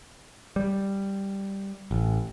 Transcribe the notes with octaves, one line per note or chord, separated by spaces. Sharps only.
G3
A1